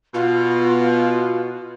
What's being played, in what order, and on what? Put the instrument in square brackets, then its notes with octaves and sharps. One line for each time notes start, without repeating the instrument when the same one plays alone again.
[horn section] B2 [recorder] F4